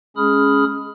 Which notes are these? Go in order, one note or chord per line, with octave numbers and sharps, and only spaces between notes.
G#3 C#4 G#4 B5 D#6 F6